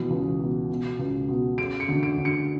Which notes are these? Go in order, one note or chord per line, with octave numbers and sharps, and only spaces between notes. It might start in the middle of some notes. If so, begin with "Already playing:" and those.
Already playing: B2 E3
C#2
B2
B2
C#2
B2
C#3 D7
C#7
D2
D7
D2
C#7